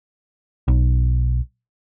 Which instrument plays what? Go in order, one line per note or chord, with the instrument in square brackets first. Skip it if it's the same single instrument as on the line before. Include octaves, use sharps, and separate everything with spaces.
[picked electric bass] B1